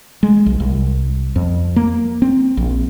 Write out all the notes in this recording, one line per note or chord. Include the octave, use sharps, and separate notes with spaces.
G#3
B1
C2
F2
A#3
C4
A#1